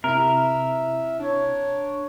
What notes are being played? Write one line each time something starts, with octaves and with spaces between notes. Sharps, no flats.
C3 E4 A#4 E5
D4 C#5